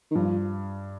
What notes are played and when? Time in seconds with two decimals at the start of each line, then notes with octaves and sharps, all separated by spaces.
0.11 D#3
0.15 G2 F3